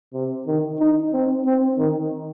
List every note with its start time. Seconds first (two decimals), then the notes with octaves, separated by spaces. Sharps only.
0.14 C3
0.47 D#3
0.79 D#4
1.13 C4
1.45 C4
1.78 D#3